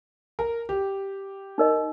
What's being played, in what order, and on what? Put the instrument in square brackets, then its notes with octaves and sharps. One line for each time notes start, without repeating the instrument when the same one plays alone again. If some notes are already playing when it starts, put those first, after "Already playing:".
[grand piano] A#4
G4
[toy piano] D#4 A#4 D#5